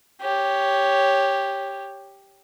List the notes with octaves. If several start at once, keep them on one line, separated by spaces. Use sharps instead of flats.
G4 C#5